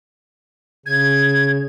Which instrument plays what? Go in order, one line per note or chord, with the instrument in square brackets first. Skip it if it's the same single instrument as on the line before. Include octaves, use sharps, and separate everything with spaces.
[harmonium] C#3 [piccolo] G#6